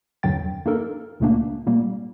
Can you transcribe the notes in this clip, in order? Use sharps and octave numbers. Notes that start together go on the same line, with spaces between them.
E2 G2 D3 F#3 G5 A6
A#3 D4 D#4 A4 A#4
C#2 A#2 C#3 A3 A#3 D4
A#2 G3 A#3